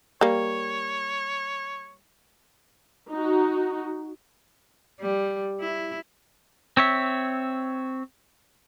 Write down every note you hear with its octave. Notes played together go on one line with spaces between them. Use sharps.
G3 A#3 C#5
D#4 F#4
G3
E4
C4 C#5 E5